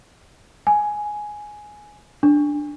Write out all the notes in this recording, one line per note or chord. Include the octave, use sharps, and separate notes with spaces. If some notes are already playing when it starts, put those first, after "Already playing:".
G#5
D4